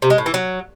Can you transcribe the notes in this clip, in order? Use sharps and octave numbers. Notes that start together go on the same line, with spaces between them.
C3
G#3
A2
E3
F#3